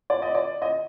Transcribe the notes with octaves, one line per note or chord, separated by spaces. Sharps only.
D5
D#5
D5
D#5